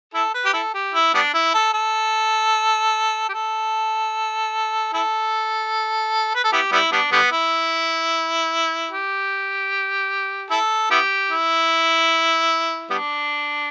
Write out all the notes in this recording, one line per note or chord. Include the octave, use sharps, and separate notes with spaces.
E4 A4
B4
G4
E4 A4
G4
E4
G3 B3 D4
E4
A4
A4
G4
A4
E4 A4
B4
A4
B3 E4 G4
G3 B3 E4
G3 B3 D4
D3 G3 B3
E4
G4
E4 A4
B3 E4 G4
E4
G3 B3 D4